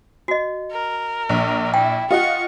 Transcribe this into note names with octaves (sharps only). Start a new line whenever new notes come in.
F#4 D#5
A#4
A#1
E4 G5
F4 D#5 F#5 C#6